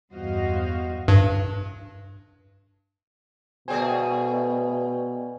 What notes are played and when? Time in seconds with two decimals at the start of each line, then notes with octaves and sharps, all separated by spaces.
0.12 E2 G2 F#4 C5 D#5 F5
1.08 G2
3.68 B2 A3 G#4 C5 D5 G5 G#5